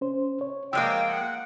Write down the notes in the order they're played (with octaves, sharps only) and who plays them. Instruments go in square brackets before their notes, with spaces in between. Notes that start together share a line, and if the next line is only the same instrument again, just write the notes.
[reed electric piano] C#4 C5
C#5
[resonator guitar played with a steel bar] F3 G#3 A#3 [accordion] G5 [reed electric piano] E6
[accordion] F#5